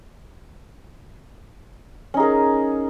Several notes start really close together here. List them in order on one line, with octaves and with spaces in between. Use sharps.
C#4 D#4 G#4 A#4